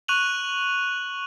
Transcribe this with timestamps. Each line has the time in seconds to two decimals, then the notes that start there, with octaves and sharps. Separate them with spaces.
0.08 C#6 F#6 D#7 F7 F#7